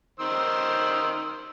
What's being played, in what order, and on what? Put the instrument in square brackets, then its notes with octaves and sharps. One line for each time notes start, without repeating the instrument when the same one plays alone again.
[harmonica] D#3 C5 E6